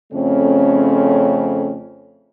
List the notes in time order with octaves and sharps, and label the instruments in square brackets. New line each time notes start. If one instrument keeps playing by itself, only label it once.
[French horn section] F2 C#3 A3 C4 C#4